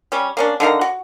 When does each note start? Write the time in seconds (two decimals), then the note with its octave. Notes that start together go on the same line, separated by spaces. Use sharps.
0.12 G3 C#4
0.37 A#3 C#4 D4
0.60 D3 D#3 F5 A#5
0.81 F#4